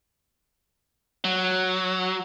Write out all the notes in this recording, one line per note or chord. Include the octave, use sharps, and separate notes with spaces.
F#3